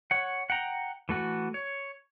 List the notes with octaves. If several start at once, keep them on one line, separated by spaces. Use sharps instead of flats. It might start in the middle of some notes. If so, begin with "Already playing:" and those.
C#5 F#5
F#5 G5 A#5
E3 A3 F#4
C#5